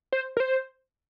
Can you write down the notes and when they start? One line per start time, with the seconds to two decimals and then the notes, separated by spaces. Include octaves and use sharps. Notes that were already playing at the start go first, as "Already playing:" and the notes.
0.13 C5
0.37 A#4
0.40 C5